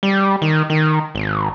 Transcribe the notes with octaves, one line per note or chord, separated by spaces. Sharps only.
G3
D#3
D#3
G#1